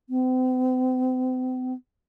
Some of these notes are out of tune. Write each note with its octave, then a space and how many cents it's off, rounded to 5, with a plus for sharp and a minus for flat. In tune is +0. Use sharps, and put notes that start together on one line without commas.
C4 -40